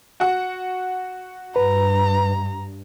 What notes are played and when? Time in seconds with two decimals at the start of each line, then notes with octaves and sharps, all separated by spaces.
0.20 F#4 F#5
1.56 G2 B4 A#5